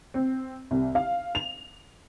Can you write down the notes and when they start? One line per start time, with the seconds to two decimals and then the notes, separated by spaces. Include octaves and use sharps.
0.14 C4
0.71 C2
0.95 F5
1.35 F7